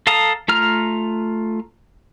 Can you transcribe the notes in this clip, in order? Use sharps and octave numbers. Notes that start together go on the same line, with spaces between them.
A4 F5 A5 A#5 D#6
A3 F4 A#5 F6